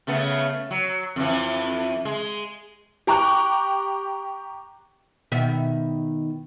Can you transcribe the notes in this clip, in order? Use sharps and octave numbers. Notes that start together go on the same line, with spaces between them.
C#3 A3 B3
F#3
F2 E3
G#3
G4 G5 A#5 C#6 D6 F#6
B2 D#3 E5